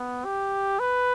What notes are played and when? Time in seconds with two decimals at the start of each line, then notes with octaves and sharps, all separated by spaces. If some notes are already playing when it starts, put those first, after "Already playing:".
Already playing: B3
0.25 G4
0.79 B4